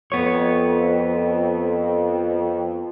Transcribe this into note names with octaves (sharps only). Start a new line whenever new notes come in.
F2 B3 C#5